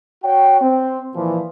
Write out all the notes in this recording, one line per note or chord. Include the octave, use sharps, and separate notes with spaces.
F#4 C#5 G5
C4
A#2 E3 F3